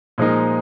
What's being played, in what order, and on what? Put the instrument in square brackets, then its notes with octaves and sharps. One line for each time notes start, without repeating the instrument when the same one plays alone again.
[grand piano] A#2 F3 G#3 D#4 A#4